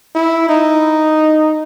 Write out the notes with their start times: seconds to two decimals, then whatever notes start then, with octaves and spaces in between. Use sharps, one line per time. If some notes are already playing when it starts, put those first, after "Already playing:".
0.15 E4
0.49 D#4